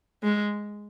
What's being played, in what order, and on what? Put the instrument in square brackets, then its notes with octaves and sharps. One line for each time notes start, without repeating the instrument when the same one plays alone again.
[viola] G#3